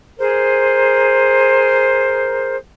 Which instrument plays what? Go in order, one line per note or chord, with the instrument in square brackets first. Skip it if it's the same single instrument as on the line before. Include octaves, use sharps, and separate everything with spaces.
[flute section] G#4 A#4 C5